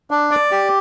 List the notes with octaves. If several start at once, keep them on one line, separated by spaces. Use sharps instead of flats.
D4
D5
G4